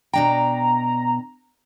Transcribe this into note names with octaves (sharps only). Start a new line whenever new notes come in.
B2 D4 G5 A#5